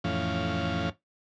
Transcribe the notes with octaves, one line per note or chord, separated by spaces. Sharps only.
F2 A2 E3 C#4 F5